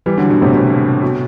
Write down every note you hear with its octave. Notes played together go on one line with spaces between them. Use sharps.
E3 G3
D3 F#3
B2 D3
A2 C3
A2 C3
B2